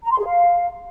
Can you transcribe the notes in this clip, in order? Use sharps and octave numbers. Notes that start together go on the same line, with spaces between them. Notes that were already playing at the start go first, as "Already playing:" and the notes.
A#5
C6
G#4
F5